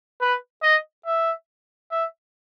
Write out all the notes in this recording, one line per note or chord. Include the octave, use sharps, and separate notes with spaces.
B4
D#5
E5
E5